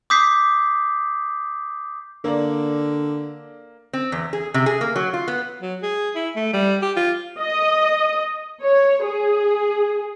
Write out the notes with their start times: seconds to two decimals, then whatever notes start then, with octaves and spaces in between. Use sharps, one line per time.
0.10 D6 D#6 G6 B6 C7
2.24 D3 A#3 D5
3.93 C4
4.12 E2
4.33 G#4
4.54 C3
4.66 G#4
4.81 A#3
4.96 F#3
5.13 F4
5.28 B3
5.62 F#3
5.83 G#4
6.16 E4
6.36 A3
6.53 G3
6.82 G4
6.96 F4
7.40 D#5
8.63 C#5
9.04 G#4